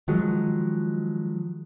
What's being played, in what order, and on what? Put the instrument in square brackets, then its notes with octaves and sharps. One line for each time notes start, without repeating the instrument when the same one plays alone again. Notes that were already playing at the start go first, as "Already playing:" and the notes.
[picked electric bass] D#3 F3 F#3 G#3